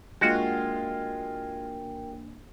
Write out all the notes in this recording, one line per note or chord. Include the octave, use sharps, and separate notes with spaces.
G#3 A#3 D4 F4 F#4 A#4 G5 G#5